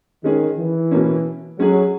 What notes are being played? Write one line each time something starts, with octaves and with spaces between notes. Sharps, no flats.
D#3 G#3 C#4 G#4
E3
B2 A#3 C#4
F#3 G#3 C#4 G#4